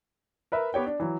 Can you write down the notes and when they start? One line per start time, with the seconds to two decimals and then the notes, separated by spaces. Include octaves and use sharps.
0.52 A#4 B4 E5
0.74 B3 G4 C#5 G5
0.86 D4
1.00 E3 F#3